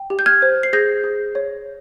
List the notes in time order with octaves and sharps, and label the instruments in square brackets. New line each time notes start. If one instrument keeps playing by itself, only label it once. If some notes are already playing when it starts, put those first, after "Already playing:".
Already playing: [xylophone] G5
G4
G6
F6 G#6
C5
C7
G#4 G6 A#6
G#4
C#5